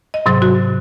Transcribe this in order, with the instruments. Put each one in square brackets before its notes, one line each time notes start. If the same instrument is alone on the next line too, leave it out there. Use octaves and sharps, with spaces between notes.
[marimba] D#5
G#2 C3 F#3 C6
F#4